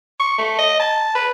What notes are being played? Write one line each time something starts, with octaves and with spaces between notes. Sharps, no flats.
C#6
A3
D#5
A5
B4